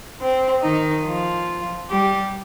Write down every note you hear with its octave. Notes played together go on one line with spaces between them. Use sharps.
C4
D#3 D#4
F3 F4
G3 G4